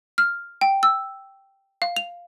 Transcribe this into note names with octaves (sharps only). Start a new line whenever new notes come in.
F6
G5
E6
F5
F7